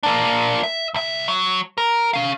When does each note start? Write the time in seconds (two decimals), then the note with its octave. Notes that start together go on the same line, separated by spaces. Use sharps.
0.03 A#3 D4
0.63 E5
0.94 C2 E5
1.28 F#3
1.78 A#4
2.13 C#4 F5